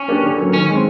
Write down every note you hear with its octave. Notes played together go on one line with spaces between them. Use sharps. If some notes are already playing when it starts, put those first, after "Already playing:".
Already playing: C#4
A#3 D4 G4
D3
F#3 A#3 C#4
D#3 C#4
G#3 C4